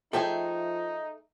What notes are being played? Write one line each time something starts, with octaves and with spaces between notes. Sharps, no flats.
F3 A3 D#4 G#4 A4 E5 G5